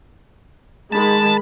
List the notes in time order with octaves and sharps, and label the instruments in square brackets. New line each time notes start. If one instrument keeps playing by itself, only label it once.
[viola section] D#3 G#3 B5 [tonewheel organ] A5